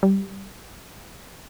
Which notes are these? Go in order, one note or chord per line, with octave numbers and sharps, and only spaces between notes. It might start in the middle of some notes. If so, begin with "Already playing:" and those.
G3